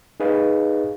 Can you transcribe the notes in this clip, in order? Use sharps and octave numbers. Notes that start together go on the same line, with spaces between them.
D#4 G#4 B4 D#5 F5